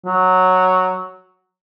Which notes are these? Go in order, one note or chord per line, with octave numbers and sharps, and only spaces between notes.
F#3